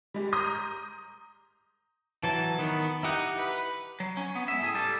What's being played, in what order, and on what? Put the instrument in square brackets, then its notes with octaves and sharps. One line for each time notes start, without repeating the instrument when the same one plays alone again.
[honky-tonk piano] G3 G#3 G4
A#5 C6 D6 D#6 G6 A#6
[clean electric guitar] E3 F#3 [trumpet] A5
[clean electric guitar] D#3 [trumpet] B3
[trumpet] D#4 [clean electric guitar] E4 G4 F#5
[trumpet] B4
[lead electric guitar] F#3
C#4
B3
G#3 E5
A2 G#4
G3 A4